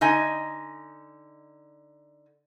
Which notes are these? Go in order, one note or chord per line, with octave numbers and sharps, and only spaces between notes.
D3 D#4 D#5 G#5